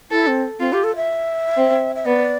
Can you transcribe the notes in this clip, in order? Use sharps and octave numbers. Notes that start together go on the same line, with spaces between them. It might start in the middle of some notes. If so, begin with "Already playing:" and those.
E4 A4
C4
C4 F4
G4
A4
E5
C4
E5
B3 D5